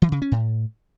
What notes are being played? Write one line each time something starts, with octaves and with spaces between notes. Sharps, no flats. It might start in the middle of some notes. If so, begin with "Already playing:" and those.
E3
C#3
C#4
A2